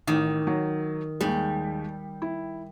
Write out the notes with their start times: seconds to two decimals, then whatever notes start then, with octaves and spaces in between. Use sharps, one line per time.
0.07 A1 D#3
0.47 F#3
1.21 D#2 D#3 G3 G#3
2.22 E4